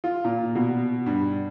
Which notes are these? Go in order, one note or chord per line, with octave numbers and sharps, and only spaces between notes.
F4
A#2
B2
G2